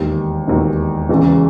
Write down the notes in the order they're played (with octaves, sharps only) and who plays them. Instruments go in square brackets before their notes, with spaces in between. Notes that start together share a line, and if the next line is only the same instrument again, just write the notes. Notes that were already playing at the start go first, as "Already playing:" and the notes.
Already playing: [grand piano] E1 D#2 D#3
E1 D#2 D#3
E1 E2 C#3